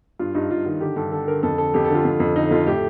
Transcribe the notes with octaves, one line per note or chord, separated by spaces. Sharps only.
G2 F4
G2 D#4
G2 F4
D#3 F4
D3 G4
G2 A4
D3 A4
D3 A#4
F2 A4
D3 A4
F2 G4
A4
D3 F4
F2
F2
D3 D#4
F2 F4
A2 G4